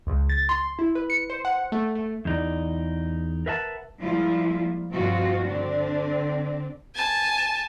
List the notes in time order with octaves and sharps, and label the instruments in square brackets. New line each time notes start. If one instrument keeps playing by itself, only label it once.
[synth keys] C#2
A6
C6
E4
B4
C#7
C5
F#5
A3
A3
[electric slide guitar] E2 D#4 D5
A#4 B4 E5 F#5 G5 A5
[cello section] F3 G3 G#3 A#3 E4 F4
G2 B2 F3 C4 F4 F#4
D3 C4 D4
[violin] G#5 A5